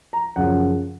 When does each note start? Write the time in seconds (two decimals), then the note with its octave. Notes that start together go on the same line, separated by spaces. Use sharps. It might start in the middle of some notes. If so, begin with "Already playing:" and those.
0.13 A#5
0.36 F#2 C#3 F3 F#5